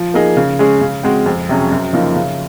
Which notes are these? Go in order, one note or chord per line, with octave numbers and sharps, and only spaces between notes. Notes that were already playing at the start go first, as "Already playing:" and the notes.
Already playing: F3
A#3 D#4 G#4
C#3
G#3 C#4 G#4
C#3
G#3 C4 F#4
F2
C3 F#3 C#4 G#4
F#2
C#3 F3 A#3 D#4
C#3